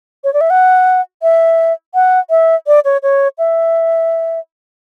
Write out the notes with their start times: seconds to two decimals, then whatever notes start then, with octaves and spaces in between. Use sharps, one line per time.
0.24 C#5
0.34 D5
0.41 E5
0.50 F#5
1.22 E5
1.94 F#5
2.30 E5
2.67 D5
2.85 C#5
3.03 C#5
3.38 E5